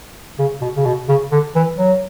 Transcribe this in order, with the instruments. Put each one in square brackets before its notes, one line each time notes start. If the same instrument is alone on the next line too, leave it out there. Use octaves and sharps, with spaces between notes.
[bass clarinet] C#3
B2
C#3
B2
C#3
D3
E3
F#3